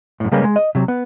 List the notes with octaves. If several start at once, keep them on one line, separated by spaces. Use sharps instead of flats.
F#2 A2
C#3 G3 G#3 A#3 B3 C#4
G#3
D#5
C3 F#3
B3